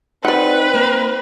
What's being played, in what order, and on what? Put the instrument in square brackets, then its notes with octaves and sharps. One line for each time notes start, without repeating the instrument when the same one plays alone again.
[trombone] C4 [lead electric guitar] D#4 [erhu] B4 [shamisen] D5 F#5
[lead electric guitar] A#3